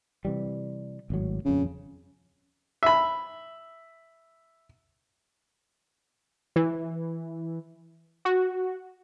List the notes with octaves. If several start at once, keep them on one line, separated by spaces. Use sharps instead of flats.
C3 E3 G3
G#1 A2 F#3
D#1 F2 C#3
E5 B5
E3
F#4